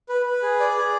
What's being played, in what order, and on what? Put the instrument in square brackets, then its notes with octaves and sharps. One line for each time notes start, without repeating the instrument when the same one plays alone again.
[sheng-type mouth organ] B4
B4
G#4
D5
G#4